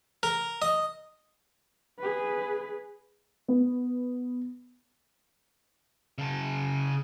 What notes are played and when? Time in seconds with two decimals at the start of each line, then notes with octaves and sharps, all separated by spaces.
0.23 A#4
0.62 D#5
1.99 G#4 B4
3.48 B3
6.18 C#3 A5